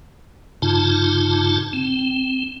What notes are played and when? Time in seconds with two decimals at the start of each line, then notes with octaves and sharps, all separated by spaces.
0.62 G2 C#3 D#4 F4 A5
1.73 C4